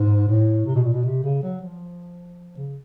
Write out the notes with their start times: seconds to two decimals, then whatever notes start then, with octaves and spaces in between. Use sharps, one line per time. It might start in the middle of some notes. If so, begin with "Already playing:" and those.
Already playing: G#2
0.28 A2
0.66 C3
0.75 B2
0.84 A#2
0.93 B2
1.04 C3
1.23 C#3
1.43 F#3
1.62 F3
2.57 C#3